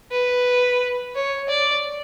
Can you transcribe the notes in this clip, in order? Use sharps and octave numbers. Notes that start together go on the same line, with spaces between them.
B4
C#5
D5